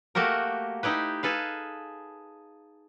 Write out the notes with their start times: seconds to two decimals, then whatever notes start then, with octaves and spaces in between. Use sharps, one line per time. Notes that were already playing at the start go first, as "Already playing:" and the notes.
0.15 A3 A#3 F#4 G4 A#4
0.83 D#4 E4 G4 B4
1.23 G#4 A4 B4 F5